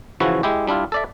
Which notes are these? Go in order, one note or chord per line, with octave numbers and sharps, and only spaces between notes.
C#3 E3 F3 E4 F#4
G#3 E4 G4
G3 D4 E4 F4
A4 D5 E5